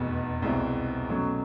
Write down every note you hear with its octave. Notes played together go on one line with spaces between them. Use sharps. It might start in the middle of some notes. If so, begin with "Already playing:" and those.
Already playing: F1 E2 B2
C2 B2 G#3 C4 E4
B2 F#3 A3 C#4